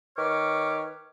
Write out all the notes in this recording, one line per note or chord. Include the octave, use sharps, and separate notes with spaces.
D#3 B4 C#5 D6 F6